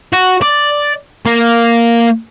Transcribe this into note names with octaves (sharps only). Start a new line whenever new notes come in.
F#4
D5
A#3